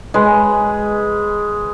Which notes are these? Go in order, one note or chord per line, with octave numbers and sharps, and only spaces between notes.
G#3 B4